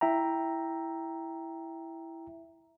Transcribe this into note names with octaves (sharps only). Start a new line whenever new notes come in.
E4 E5 G5 A#5